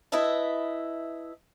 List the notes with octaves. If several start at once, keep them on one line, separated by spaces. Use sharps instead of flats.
E4 B4 D#5 E5 A5